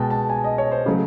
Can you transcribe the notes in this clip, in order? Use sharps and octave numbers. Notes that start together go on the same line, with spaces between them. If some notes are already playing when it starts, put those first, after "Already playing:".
Already playing: B2 G#3 G5 A5
A5
G#5
D#5
C#5
C5
C#3 F#3 A3